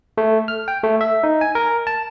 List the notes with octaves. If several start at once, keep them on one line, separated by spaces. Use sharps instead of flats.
A3
F6
G5
A3
E5
D#4
G#5
A#4
A5